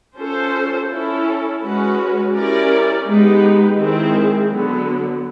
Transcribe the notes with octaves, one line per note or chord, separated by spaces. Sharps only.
C#4 F4 A4 C5
C#4 E4 A4
G#3 C#4 F#4 B4
C#4 E4 G4 A#4 D5
G#3 B3 D#4 G4 B4
D#3 G#3 C4 E4 G#4
D3 F#3 B3